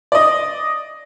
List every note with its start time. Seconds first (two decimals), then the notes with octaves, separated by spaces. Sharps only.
0.12 D5 D#5